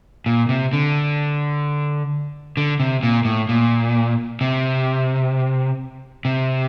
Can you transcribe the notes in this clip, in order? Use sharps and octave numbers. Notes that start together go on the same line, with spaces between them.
A#2
C3
D3
D3
C3
A#2
A2
A#2
C3
C3